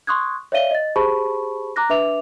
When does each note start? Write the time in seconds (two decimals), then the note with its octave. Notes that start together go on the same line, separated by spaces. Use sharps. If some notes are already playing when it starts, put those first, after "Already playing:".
0.07 C6 C#6 D#6 F#6 G#6
0.52 C#5 D5 E5 F5 D#7 G7
0.71 D#5 A6
0.96 G4 G#4 C5 A5 B5 C#6
1.76 A#5 D6 F#6 A#6
1.89 D4 B4 E5 D6 F7